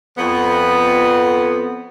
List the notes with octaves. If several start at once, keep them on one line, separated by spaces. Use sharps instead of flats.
F2 B3